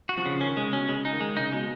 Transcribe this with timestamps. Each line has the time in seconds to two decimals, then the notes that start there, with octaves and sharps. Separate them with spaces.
0.09 F#4
0.17 F3
0.26 C#3
0.41 D#3 C#4
0.57 C#3 G#3
0.73 B2 C#4
0.89 C#3 G#3
1.05 D#4
1.13 D#3
1.21 G#3
1.37 C#3 D#4
1.52 B2 G#3